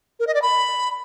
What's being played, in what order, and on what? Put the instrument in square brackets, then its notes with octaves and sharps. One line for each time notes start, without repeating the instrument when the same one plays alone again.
[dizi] A#4
D#5
D5
B5